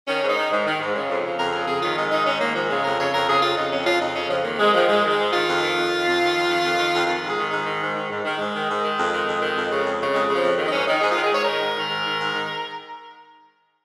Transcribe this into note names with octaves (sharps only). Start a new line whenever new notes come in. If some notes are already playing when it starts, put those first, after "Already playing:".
D#3 C#4
G#2
D#4
D#3
G#2
D#3
G#2
C#3
F2
C#3
F2 A#4
C#3 A#4
F2 G#4
D#3 F4
G#2 D#4
D#3 D#4
G#2 C#4
D#3 A#3
G#2 F3
C#3 G#3
F2 A#4
C#3 C#5
F2 A#4
C#3 G#4
F2 F4
C#3 D#4
F2 C#4
C#3 F4
F2 D#4
C#3 C#4
F2 F3
D#3 A#3
G#2 G#3
D#3 F3
G#2 G#3
D#3
G#3
G#2
D#3 F4
F2
D#3
F2
D#3
F2
D#3
F2
D#3
F2
D#3
F2
D#3 F4
G#2
G#4
D#3
G#2 D#4
D#3
G#2
D#3
G#2
D#3
G#2 G#3
D#3
G#2
D#3
F2
D#3
F2
D#3
F2
C#3
F2
C#3
F2 G#3
C#3
F3
F2
D#3
D#4
G#2 C#4
D#3 D#4
G#2 G#4
D#3 F4
G#4
G#2 C#5
D#3 A#4
G#2
D#3
G#2
D#3
G#2
D#3